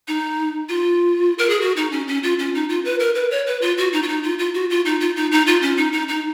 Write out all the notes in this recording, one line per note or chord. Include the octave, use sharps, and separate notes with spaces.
D#4
F4
A#4
G#4
F#4
D#4
C#4
C#4
F4
C#4
D#4
F4
B4
A#4
B4
C#5
B4
F4
F#4
D#4
F4
D#4
F4
F4
F#4
F4
D#4
F4
D#4
D#4
F4
C#4
D#4
D#4
D#4